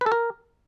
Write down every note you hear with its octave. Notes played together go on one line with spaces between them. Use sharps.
B4
A4
A#4